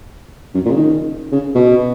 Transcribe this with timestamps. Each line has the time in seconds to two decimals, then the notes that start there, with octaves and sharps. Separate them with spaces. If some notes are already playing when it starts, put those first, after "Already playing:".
0.55 F#2
0.65 A#2
0.71 C#3
0.76 D#3
1.32 C#3
1.55 B2